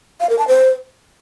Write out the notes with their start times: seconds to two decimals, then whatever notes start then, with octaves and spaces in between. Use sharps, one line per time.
0.20 F5
0.30 A#4
0.39 A5
0.48 C5